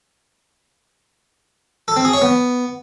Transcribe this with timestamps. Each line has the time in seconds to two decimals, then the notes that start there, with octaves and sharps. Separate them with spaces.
1.88 A4
1.96 C4
2.05 G#4
2.13 C#5
2.22 B3